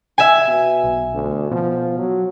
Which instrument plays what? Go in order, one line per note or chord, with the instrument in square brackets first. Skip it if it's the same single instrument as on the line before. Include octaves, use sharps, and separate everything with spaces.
[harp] E5 G#5
[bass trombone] B2
[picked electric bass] B1
[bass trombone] D2
[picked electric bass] B2 [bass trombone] F3
[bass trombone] F#3